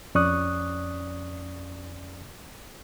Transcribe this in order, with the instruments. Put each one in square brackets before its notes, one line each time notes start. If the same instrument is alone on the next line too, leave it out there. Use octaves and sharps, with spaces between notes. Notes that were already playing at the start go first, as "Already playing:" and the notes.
[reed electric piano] F2 C#4 D5 C#6 D#6 F#6